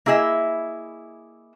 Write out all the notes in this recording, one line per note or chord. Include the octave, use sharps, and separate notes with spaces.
A#3 E4 G#4 D#5 E5